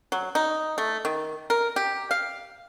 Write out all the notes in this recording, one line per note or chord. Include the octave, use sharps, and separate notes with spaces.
F#3
D#4
A3
D#3
A#4
G4
F5